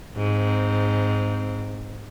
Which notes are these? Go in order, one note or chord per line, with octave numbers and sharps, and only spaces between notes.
G#2 C4